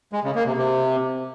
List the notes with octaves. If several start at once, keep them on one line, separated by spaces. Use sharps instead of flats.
G#3
C#3
A#3
C3
C3